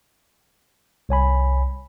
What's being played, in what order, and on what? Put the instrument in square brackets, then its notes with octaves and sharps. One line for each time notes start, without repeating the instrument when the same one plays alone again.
[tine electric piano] C2 C#5 G#5 B5